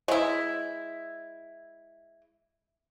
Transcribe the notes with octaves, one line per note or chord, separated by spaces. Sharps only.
G#3 E4